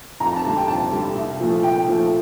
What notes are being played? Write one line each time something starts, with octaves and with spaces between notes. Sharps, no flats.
F2 A#5
A5
D3 G3
G5
F2 A5
D3 G3
C2
A#2 F3 A3
C2 G5
A#2 F3 A3